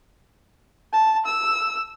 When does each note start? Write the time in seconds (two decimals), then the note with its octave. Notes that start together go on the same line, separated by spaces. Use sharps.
0.93 A5
1.26 E6